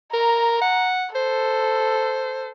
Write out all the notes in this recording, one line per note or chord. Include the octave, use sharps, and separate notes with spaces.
A#4 A#5
F#5
A4 C5